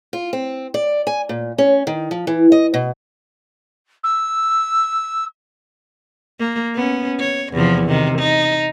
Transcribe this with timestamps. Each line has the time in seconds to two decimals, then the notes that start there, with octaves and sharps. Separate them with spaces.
0.13 F4
0.33 C4
0.74 D5
1.07 G#5
1.29 A#2
1.58 C#4
1.87 D#3
2.11 F3
2.27 E3
2.52 D#5
2.74 B2
4.03 E6
6.39 A#3
6.75 B3 C#4
7.20 C#5
7.53 E2 C3 F3
7.86 C3 D#3
8.18 D#4